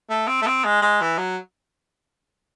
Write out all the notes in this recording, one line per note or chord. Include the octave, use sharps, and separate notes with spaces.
A3
C4
A3
C4
G#3
G#3
E3
F#3